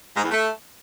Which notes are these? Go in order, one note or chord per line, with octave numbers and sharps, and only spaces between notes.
G#2
E2
A3